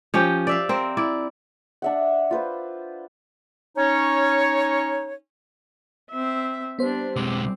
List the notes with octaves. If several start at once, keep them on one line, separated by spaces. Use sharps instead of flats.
F3 C#4 G4 G5
D5 E5 F5
C4 A#4
E4 D5
D4 E5 F#5
F4 B4 C5
C#4 D#4 C#5
C4 E5
G3 B3 D4 C5
B1 G#3 C4 D6